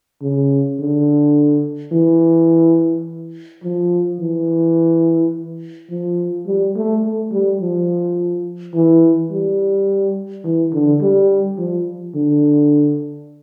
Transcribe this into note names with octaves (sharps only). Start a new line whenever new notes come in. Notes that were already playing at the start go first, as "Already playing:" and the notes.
C#3
D3
E3
F3
E3
F3
G3
A3
A3
G3
F3
E3
G3
E3
D3
G3
F3
D3